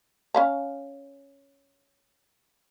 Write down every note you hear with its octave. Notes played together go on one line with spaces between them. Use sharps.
C#4 F5 A#5